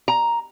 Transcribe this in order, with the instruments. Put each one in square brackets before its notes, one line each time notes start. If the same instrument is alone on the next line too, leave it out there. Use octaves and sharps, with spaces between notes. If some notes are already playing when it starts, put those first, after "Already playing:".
[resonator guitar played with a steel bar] A#5